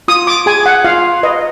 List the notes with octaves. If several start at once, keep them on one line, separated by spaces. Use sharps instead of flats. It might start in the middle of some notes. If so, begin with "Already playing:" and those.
F4 D#6
D6
G#4 G#5
F#5
F4 F5
B4 D#5